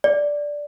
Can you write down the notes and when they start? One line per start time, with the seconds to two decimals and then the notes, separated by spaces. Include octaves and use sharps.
0.04 D5